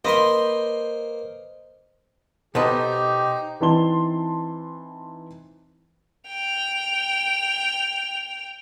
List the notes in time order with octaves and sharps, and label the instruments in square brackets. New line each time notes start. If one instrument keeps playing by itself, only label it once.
[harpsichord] A#3 C6 [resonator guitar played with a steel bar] B4 C5 [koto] D#5
[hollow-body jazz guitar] B2 A4 B4 [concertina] D#4 [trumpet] G4 [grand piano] C5 D#5
[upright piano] E3 C4 D#4 A5 C6 G7
[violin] G5 F7